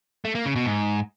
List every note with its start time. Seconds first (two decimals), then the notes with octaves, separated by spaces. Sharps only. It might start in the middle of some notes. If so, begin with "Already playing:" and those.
0.25 A3
0.35 A#3
0.45 C#3
0.56 B2
0.66 G#2